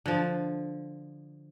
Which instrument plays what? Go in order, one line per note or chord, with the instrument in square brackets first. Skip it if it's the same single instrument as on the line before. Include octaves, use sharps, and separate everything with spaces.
[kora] D3 F3